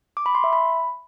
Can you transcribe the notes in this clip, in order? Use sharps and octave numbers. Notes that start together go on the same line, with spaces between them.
D6
B5
C6
E5
B5